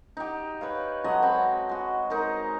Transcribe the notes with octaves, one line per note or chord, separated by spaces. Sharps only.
D#4 G4
B4 C#5 F5
F#3 G#3 A4 D#5
C4 C#5 F#5 B5
G#3 F#4
G#3 D#4 A#4 A#5